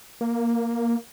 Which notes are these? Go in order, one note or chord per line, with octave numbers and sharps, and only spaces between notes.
A#3